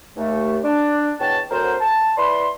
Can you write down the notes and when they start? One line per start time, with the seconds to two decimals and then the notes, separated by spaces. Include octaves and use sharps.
0.16 D#2 A3
0.64 D4
1.20 E2 B2 C#5 G5 A5
1.51 D2 F#3 C4 A#4 C5
1.81 A5
2.17 E4 B4 D5 B5 C6